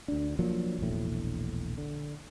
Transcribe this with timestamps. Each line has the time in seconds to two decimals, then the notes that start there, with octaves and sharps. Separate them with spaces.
0.08 D2 D4
0.39 F3 F#3 A#3 D4
0.79 E1 A#1 A2
1.78 D3